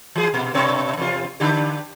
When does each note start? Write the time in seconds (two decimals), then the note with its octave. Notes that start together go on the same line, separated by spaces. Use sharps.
0.16 E3 G#4
0.34 A#2
0.54 G2 B2 C#5
0.97 E2 C3 F4
1.40 D3 D4 G4